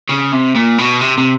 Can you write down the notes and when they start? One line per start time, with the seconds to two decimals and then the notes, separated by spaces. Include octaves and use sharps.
0.10 C#3
0.33 C3
0.56 A#2
0.78 B2
1.01 C3
1.18 C3